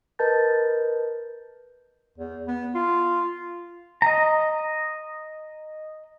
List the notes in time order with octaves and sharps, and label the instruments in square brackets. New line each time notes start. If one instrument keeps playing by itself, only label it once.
[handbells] A#4 B4 D#5 A5 G6 A6
[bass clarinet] E2
B3
F4
[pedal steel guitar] D#5 A#5